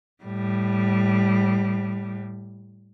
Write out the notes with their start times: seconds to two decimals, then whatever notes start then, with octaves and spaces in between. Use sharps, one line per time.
0.23 A2 G3